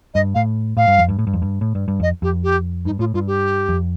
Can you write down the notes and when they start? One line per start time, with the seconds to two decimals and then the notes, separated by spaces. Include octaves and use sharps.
0.15 G2 D#5
0.35 A2 F5
0.77 A2 F5
0.88 G2
0.98 F2
1.09 G2
1.19 A2
1.27 G2
1.33 F2
1.42 G2
1.61 A2
1.75 G2
1.88 G2
2.00 F2 D#5
2.22 F2 G4
2.44 G4
2.85 G2 D#4
2.99 A2 F4
3.14 G2 F4
3.27 G4
3.69 F2